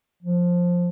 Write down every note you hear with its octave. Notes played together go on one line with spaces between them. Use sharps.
F3